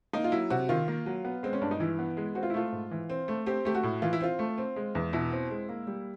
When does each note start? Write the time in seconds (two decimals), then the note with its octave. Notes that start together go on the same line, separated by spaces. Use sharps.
0.13 A#3 D#4
0.24 F4
0.32 F#3 E4
0.50 C3 F#4
0.69 D#3 F4
0.88 A#3
1.06 F#3
1.24 B3
1.43 G#3 C4
1.53 C#4
1.61 G2 D4
1.71 D#4
1.80 E3 E4
1.99 B3
2.17 G#3
2.35 C4 F#4
2.43 F4
2.50 E4
2.54 A3 F4
2.72 G#2
2.91 E3
3.10 C4
3.28 A3
3.46 C4 G4
3.65 A3 G4
3.75 F#4
3.83 A2
4.02 E3 F4
4.13 E4
4.21 C4 F4
4.39 A3
4.58 C4
4.76 G#3
4.95 E2
5.13 B2 E4
5.32 C4
5.50 G#3
5.69 A#3
5.87 G3